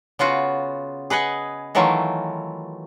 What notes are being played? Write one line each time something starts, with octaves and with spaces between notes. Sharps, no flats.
C#3 B3 F4 F#4
G#4 B4 D#5 F#5 G#5
D#3 E3 F#3 A3 E4 F4